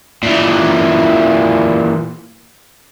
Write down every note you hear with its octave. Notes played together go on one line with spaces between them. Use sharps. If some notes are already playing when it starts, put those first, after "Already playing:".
A#2 E3